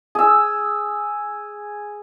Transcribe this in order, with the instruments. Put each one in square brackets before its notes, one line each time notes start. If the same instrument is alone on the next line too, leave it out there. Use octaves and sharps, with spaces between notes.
[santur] G#4 E6